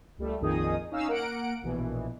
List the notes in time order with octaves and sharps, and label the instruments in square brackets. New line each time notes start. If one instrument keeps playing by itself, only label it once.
[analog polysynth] C#2 G3 A3
A#1 F2 D#3 D#4 G#4 D#6
C#4 D#4 F5 E6
A#3 A#4 F#5 D7
A#1 B2 E3